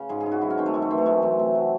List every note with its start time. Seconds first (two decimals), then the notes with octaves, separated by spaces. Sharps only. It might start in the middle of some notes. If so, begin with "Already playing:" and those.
Already playing: C#3
0.09 G#2 G#4
0.20 G#4
0.26 G#2
0.32 F#4
0.41 F#3 E4
0.50 C#4
0.58 D#3 C4
0.66 A3
0.74 F#2 G#3
0.82 A3
0.91 E3 C4
0.98 A3
1.06 F#2 G#3
1.22 E3 A3
1.39 C3
1.55 F#3